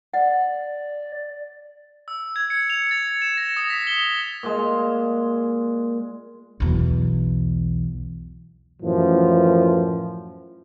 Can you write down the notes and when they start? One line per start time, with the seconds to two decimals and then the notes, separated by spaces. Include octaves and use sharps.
0.14 D5 F#5
2.08 E6
2.36 G#6
2.50 C#7
2.70 F7
2.91 A6
3.22 E7
3.37 A#6
3.57 D#6
3.70 B6
3.87 G7
4.43 A#2 G#3
6.60 B1 E2
8.82 F#2 A2 E3 F3